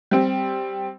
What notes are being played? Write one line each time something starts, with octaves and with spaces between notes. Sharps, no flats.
G3 C4